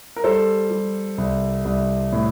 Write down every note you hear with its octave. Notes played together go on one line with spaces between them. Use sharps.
A#4
G3 A4 C5
G3
C2
C2
A2